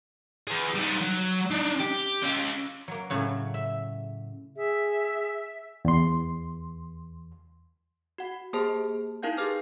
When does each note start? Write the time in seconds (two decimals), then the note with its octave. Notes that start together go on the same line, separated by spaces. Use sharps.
0.47 G#4 B4
0.75 G3 D#4
1.01 F#3
1.50 D4 D#4
1.80 G4
2.23 C#4 F4
2.88 F#3 A#3
3.10 A2 C#3 F#3
3.54 E5
4.56 G#4 E5
5.85 E2 C6
8.18 F#4 F#5
8.53 A#3 G4 G#4 C5 A5
9.23 D#4 E4 A#4 F5 G5 G6
9.37 G4 G#4 B4 D6 F6